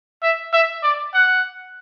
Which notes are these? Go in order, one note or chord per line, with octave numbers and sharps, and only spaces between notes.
E5
E5
D5
F#5